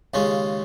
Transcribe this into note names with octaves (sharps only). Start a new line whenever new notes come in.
D#2 C#3 G#3 C#4 F4